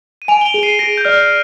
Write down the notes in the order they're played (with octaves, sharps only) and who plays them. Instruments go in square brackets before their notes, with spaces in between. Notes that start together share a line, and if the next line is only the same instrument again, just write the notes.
[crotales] D#7
[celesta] G#5 [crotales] D7 F7
[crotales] G7
D7 F7
[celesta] G#4
[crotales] C7 D#7
[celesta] G#4 [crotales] A#6 D7
[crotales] G6
[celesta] D5 [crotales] F6